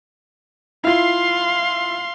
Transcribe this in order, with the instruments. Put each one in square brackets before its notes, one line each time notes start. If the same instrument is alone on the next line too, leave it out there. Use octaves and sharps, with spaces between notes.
[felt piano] E4 F4 [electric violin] F5 C6